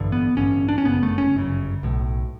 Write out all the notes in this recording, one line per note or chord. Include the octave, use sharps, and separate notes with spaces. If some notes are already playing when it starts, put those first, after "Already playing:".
Already playing: A1 G2 D3
B3
A1 G2 D3 C#4
D4
C#4
G1 F#2 C#3 B3
A3
C#4
G1 F#2 C#3
B1 A2